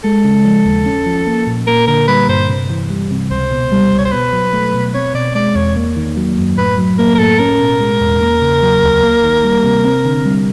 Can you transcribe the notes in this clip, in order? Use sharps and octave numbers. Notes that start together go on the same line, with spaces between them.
G#3 A4
C#3
F3
D#2
C#4
F3
A#3
A#2
A#3 A#4
D3 A#4
G3 B4
G2 C5
C3
E3
G3
C3
C#2 C5
B2
G3
C#2
C#5
C5
B2 B4
F#3
A3
B2
C4 C#5
B2 D5
G#3 D5
E2 C#5
A#3
D#3
F#3
F#2
A2 B4
F#3
A#3 A#4
A#4
A2 A4
C#4 A#4
B2
G#3
E2
A#3
C#3
F#3
D2
A#3
D#3
G3
C3
C4
D3
G3